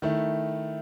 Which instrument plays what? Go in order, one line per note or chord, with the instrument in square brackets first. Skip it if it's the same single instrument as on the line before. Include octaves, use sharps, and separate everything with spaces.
[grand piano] D#3 A3 E4